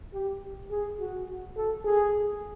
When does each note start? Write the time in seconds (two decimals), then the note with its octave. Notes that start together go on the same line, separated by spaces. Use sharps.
0.14 G4
0.71 G#4
1.00 F#4
1.56 A4
1.85 G#4